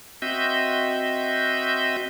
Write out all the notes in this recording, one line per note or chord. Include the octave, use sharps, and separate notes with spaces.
C4 F#4 D#5 E5 G6